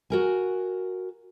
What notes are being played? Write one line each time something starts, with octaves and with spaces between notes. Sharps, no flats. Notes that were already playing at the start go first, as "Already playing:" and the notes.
F#4 A#4 G#5